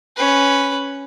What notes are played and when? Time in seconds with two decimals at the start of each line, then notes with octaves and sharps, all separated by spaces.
0.16 C#4 B4